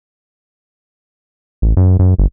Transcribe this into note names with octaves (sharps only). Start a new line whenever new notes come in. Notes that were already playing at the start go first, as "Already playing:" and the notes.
A1
F#2
F#2
G1